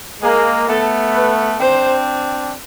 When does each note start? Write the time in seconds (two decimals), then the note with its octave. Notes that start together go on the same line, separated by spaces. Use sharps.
0.22 G#3 A#3 G#4
0.68 A3 B3 A4
1.15 B4
1.59 C4 D4 C5